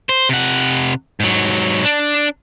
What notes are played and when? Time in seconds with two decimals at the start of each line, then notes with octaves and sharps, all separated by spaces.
0.09 C5
0.29 C3 F#5
1.20 G#2 F#3
1.84 D4